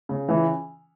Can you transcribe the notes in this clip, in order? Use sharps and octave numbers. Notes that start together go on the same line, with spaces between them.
C#3
E3